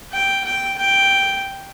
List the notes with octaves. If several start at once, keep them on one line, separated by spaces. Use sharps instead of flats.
G5
G5
G5